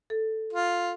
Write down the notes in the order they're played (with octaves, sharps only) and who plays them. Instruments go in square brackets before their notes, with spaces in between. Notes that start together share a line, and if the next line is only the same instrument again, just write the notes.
[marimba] A4
[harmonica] F4